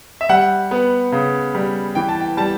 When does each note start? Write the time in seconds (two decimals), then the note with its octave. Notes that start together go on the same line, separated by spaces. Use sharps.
0.21 E5
0.29 G3 F#5
0.71 B3
1.12 C#3
1.55 G3
1.95 E3 G5
2.09 A5
2.21 G5
2.37 G3 A5